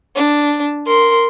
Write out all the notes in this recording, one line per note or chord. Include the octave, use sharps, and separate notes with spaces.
D4
A#4 C6